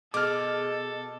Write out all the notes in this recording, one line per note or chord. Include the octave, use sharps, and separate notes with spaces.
B2 G#4 A4 D6 F6